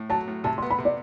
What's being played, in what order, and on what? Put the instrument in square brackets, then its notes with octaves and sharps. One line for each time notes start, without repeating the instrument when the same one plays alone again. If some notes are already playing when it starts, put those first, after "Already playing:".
Already playing: [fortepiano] A2
[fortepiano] F#3 [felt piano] A5
[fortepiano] A2
[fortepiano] C3 [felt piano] A5
[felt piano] C6
[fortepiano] B3
[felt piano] B5
[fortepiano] C3
[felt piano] D5